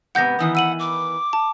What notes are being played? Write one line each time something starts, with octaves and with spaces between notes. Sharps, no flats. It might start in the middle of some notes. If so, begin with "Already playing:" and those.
G#2 C3 B3 F#5 G6 A#6
D#3 E3 B3 D#6
F#5 E6 D#7 F#7
D6
A5